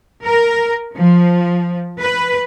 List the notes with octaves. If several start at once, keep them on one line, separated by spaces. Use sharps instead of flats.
A#4
F3
B4